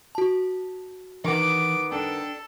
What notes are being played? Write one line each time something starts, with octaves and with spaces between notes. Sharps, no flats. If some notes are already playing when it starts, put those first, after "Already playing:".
F#4 A5
D#3 E3 B3 D6
D4 A4 G5